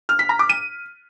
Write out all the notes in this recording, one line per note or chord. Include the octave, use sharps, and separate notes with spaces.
F6
B6
A#5
D6
D#7